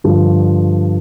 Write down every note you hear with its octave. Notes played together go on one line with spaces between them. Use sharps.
G2 D3 F3